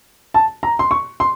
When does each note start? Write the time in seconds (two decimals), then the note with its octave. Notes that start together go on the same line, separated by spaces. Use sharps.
0.34 A5
0.63 A#5
0.79 C6
0.91 C#6
1.20 C6